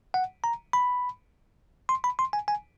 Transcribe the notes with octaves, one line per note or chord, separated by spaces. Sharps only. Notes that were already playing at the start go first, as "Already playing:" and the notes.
F#5
A#5
B5
C6
B5
C6
G#5
G#5